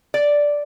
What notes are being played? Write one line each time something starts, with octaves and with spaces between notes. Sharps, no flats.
D5